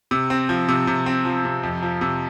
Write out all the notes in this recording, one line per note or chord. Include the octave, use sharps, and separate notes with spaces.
C3
C4
F3
C3
C3
C4
F3
C3
F2
F3
C3